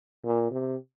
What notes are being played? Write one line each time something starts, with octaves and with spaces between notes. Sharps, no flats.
A#2
C3